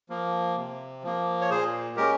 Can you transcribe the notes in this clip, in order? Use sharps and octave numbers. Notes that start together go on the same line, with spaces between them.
F3 A#3
C3
F3 A#3
C#5
A#2 G#4 C5
G#3 C#4 G4 A#4